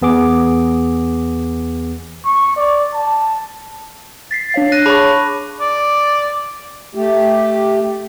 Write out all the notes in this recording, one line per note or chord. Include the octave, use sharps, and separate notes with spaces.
E2 B3 G#4 D6
C#6
D5
A5
A6 B6 C7
D4 C#5 F5
F#6 A#6 D#7
G#4 C#5 A5 B5 C#6 D6
D5
A3 G4